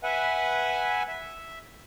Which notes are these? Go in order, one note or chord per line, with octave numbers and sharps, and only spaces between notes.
B4 E5 F#5 G#5
E5